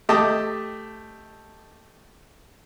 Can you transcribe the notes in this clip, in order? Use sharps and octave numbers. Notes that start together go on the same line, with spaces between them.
A3 G4 D#5 A5 D6